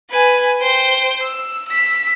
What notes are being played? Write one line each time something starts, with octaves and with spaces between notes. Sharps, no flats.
B4 G#5
C5 G5
E6
E6 B6